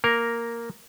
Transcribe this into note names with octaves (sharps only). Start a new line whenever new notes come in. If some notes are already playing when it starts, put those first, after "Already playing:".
A#3 A#4